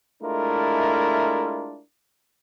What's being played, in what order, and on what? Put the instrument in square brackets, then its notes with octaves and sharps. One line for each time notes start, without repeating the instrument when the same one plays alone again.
[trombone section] G#3 A3 D4 E4 F4 A#4